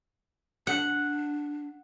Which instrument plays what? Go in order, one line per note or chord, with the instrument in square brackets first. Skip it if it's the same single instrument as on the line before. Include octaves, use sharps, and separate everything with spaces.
[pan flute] D4 [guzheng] F#5